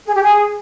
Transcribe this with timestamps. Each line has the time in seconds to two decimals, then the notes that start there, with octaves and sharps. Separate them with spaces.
0.06 G#4
0.15 G4
0.23 G#4